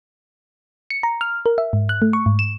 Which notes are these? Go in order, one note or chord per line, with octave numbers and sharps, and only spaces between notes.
C#7
A#5
F6
A#4
E5
G#2
F#6
A3
C#6
G#2
E7